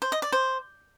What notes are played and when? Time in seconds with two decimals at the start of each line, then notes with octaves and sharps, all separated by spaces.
0.02 C5
0.12 D#5
0.22 D5
0.32 C5